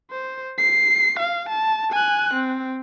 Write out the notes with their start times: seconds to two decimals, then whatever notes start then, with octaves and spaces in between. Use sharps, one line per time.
0.11 C5
0.58 C7
1.19 F5
1.49 A5
1.92 G#5 F#6
2.34 C4